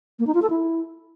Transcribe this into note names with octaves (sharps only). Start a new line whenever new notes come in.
A#3
D#4
F4
A4
E4